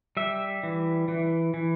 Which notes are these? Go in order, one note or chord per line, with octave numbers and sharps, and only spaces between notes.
G3 E5
E3
E3
E3